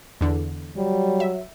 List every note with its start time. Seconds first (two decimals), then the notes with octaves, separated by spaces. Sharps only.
0.21 E2 D3
0.77 F#3 G3
1.20 E5